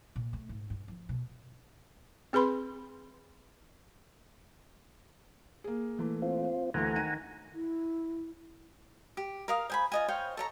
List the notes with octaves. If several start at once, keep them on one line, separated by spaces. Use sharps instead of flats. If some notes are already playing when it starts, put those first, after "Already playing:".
A#2
A3
G#2
G2
F3
B2
C4 G#4 B4 B5 C6
A#3 G#4
A#2 E3 A3
C4 F4
D2 E3 A3 F#5 G#5 A#5
D#3 D#7
E4
G4
A#4 F5 D#6
C5 G#5 B5
F4 D#5 G#5
C5 C#5 F5 G5
A4 C#5 A#5